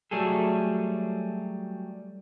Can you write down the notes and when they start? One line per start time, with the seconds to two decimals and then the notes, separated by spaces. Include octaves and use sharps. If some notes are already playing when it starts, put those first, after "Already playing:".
0.11 F#3 G3 A3 G#4 A4